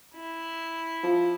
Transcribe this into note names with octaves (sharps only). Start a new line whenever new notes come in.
E4
F3